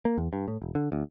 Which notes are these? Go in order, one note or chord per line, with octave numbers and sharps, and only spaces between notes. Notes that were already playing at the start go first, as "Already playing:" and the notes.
A#3
E2
G2
A2
E1
D3
D2